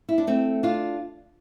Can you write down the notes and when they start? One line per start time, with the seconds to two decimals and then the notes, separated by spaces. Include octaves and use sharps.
0.09 E4
0.18 D4
0.27 A3 C4
0.63 D4 F4